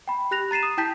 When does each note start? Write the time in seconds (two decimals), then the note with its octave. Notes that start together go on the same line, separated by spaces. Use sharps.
0.08 G5 B5
0.31 G4 F#6 A#6 F7
0.51 A#5 A6 C7 D#7 E7
0.63 D#6
0.77 E4 G5 A5 G6 B6